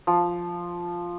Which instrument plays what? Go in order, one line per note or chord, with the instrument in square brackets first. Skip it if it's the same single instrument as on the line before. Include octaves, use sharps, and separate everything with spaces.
[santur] F3